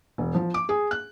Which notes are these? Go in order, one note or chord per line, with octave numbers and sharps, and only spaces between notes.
E1
F3
D6
G#4
F#6